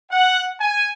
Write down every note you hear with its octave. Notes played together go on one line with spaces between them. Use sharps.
F#5
G#5